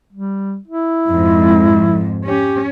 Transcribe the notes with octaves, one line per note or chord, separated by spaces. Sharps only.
G3
E4
F2 G#2
C#4 G4